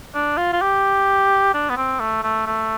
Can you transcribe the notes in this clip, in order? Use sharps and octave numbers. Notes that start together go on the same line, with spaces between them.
D4
F4
F4
G4
D4
B3
C4
A3
A3
A3